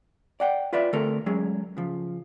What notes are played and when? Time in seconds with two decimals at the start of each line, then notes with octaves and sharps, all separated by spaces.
0.40 D5 F#5 G5
0.73 F4 B4 D5 E5
0.93 D3 A3 C4 A4 A#4
1.26 F#3 G#3 C#4 G#4
1.77 C#3 F3